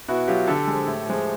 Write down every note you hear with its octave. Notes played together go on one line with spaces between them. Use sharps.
B2 E4 F#4
F#3 F4 G4
D3 G4 A4
F3 G#3
A2
F3 G#3